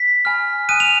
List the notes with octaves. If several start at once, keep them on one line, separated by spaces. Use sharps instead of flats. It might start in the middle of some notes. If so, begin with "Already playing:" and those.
Already playing: B6
G#5 B5 F6
G#5 D#6 F#6 D#7
F7